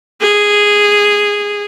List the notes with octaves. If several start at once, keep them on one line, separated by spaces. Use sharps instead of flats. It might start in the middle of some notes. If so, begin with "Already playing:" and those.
G#4